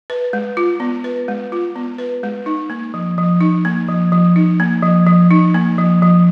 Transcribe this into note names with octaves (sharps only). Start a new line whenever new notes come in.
B4
G#3
F4
B3
B4
G#3
F4
B3
B4
G#3
D#4
A#3
F3
F3
D#4
A#3
F3
F3
D#4
A#3
F3
F3
D#4
A#3
F3
F3